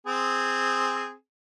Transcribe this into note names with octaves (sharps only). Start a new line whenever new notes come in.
C4 G#4